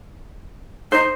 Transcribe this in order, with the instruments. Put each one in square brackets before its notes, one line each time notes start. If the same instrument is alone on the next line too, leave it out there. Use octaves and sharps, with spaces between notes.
[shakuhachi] D#4 [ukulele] C5